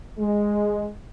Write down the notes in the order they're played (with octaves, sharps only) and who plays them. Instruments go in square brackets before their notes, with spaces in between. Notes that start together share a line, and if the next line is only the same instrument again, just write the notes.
[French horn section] G#3